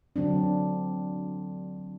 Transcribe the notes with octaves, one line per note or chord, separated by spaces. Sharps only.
D3 F#3 C4 D4